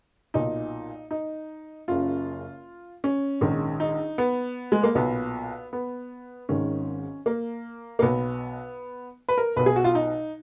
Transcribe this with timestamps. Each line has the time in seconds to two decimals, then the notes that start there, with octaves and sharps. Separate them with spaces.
0.34 B1 A#2 D#4
1.11 D#4
1.88 F#1 F#2 C#3 F4
3.04 C#4
3.41 A#1 G#2 D#3
3.80 D#4
4.18 B3
4.72 G#3
4.83 A#3
4.95 B1 A#2 B3
5.73 B3
6.49 G#1 G#2 D#3 C#4
7.26 A#3
7.99 A#3
8.02 B1 B2 B3
9.29 B4
9.38 A#4
9.56 B1 B2 B4
9.66 G#4
9.76 F#4
9.84 F4
9.95 D#4